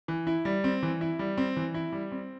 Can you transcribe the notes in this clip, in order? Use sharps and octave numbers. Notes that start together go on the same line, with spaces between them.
E3
E4
G3
C4
E3
E4
G3
C4
E3
E4
G3
C4